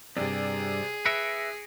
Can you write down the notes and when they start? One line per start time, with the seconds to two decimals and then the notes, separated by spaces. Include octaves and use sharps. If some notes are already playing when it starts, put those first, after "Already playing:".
0.17 C2 G2 C3 G#4 D5
1.06 B4 E5 A#6 C#7 D7